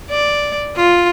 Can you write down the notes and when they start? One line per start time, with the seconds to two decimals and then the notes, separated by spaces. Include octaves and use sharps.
0.11 D5
0.76 F4